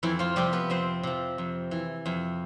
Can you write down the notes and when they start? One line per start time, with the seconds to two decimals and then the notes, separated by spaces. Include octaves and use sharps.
0.03 F2 E3 E4
0.19 F3 F4
0.36 C3 F3 G3 G4
0.53 B3 B4
0.70 F2 C4 C5
1.03 C3 F3
1.38 F2
1.71 E3
2.06 F2